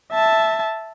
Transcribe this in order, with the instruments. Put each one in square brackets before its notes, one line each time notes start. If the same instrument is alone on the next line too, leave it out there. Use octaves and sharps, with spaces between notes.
[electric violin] E5 A5